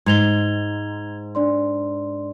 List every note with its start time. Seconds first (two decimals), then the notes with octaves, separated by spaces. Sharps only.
0.06 G#2 G#6 F7 G7
1.35 D4 D5 C6